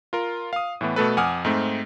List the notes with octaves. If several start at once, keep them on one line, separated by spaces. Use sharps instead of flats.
F4 A#4
F5 D#6
A2 E3 A3 B3
B2 A3 A4 B4
F2 F#5 G#5 D6 D#6 F6
G#2 A3 C4